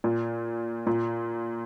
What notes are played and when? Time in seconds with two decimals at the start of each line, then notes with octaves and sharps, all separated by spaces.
0.04 A#2
0.87 A#2